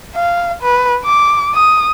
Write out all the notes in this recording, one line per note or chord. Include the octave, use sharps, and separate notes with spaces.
F5
B4
D6
D#6